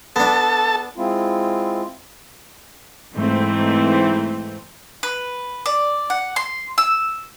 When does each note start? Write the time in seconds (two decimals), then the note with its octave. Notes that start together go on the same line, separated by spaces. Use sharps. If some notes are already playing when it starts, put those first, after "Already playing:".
0.16 B3 D4 A4 A5
0.96 G#3 C4 E4 F4
3.14 G#2 E3 A3 C4
5.03 B4
5.66 D5
6.10 F#5
6.36 C6
6.78 E6